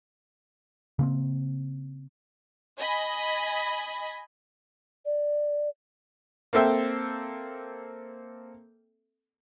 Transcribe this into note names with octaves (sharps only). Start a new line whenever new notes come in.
C#3 A#3 C4
D#5 G#5 B5
D5
A#3 C4 A4 E5 G5